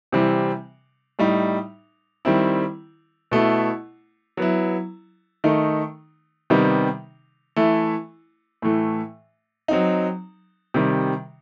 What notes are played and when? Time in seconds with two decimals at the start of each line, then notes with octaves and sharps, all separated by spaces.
0.12 C3 E3 G3 C4
1.19 A2 G3 D#4
2.25 D#3 G3 C4 E4
3.31 B2 A3 E4
4.37 F#3 B3 E4
5.44 D#3 A3 D#4
6.50 C3 D#3 G3 B3 D#4
7.56 E3 A3 E4
8.62 A2 E3 A3
9.68 F#3 C4 D#4
10.74 C3 D#3 G3